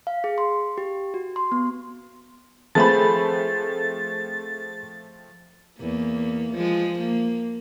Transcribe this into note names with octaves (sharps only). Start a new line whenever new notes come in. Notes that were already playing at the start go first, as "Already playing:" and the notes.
F5
G#4
C6
G4
F#4
C6
B3
F3 A3 C4 G#4 A4 B4 B5 A6
E2 A#3
F3 G#3
A#3